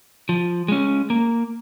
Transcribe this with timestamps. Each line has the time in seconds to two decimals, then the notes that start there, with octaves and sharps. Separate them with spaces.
0.29 F3
0.68 G#3 C#4
1.10 A#3